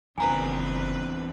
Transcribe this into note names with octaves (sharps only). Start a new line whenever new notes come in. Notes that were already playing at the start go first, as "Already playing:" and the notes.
F#1 E2 D#3 C4 D4 B4 G#5 A#5